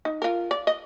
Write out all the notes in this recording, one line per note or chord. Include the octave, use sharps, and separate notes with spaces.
D#4
F4 A#4
D5
D#5